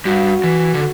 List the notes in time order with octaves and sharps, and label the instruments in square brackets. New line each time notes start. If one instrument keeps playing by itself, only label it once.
[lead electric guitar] G2 [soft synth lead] F#4
[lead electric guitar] E3
D3